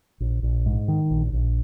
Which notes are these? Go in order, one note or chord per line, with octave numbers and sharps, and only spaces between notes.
A#1
A#1
G#2
D#3
A#1
A#1